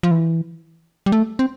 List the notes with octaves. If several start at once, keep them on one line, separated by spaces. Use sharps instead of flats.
F3
E3
G3
A3
C4